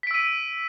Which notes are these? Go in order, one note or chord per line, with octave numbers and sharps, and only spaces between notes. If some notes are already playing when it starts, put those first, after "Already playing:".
E6 B6 D7 D#7